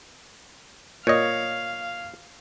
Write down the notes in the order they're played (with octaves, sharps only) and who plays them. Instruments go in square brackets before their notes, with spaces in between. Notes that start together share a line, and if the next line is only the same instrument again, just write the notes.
[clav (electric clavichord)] A#2 D#5 [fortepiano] C#5 [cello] F5